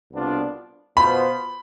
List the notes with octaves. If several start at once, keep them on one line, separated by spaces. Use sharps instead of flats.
C2 B2 B3 D4 F4
B2 B3 F4 C5 B5